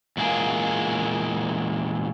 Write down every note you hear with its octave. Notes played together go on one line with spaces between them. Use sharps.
E2 A#2 G#3 A#3 G#4